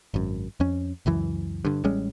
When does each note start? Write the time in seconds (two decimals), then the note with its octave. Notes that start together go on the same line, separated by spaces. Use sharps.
0.14 G#1 F#2
0.60 F2 C#4
1.06 C#2 F#2 E3
1.65 G2 D3
1.84 A1 G3 G#3 C#4